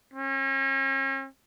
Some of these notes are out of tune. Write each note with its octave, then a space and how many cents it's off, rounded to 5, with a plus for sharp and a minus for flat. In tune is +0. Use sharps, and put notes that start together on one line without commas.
C#4 -40